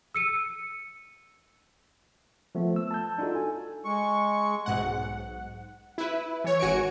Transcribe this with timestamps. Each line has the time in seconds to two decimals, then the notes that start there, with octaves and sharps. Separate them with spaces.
0.14 E6 C#7 D#7
2.55 F3 A3 B3
2.76 E6
2.91 A5 E6 G6
3.18 D4 D#4 F4 F#4 A4
3.35 A4 G#5
3.85 G#3 C#6
4.66 B1 G#2 F#5
5.98 E4 B4
6.44 E3 C#5
6.59 G#1 F#4 G#5 C#6 C#7 D7